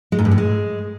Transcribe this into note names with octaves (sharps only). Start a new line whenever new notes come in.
G#3
G#2
G2
A2
G#3